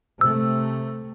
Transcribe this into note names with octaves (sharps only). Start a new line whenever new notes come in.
C3 A3 E6